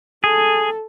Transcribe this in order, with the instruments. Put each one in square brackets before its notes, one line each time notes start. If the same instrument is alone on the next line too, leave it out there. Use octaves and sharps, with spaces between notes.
[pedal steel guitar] G#4 [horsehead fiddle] A4